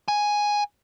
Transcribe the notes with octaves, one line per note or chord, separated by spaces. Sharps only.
G#5